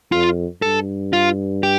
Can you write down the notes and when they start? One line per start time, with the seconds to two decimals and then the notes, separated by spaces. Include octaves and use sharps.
0.11 F2 F4
0.62 G2 A4
1.13 F4
1.63 G4